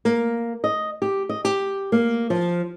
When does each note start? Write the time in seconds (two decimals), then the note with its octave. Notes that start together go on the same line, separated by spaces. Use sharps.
0.05 A#3
0.64 D#5
1.02 G4
1.29 D#5
1.45 G4
1.92 A#3
2.30 F3